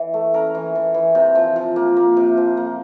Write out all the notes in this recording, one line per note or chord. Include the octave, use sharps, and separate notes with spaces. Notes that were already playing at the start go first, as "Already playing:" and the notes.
Already playing: E3
A3
C#4 A#4
E3
E3
E3
C3
F3
F3
A#3
A#3
C3
F3
A#3